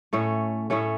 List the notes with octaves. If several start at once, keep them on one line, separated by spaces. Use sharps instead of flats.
A2 A3 C#4
A2 A3 C#4